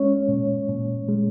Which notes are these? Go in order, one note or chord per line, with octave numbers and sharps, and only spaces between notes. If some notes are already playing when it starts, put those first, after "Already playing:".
Already playing: G#3 C#4 C#5
A#2
A#2
G#3